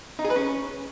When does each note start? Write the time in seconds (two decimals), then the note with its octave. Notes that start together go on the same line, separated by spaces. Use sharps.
0.19 D#4
0.24 G#4
0.30 B4
0.36 C#4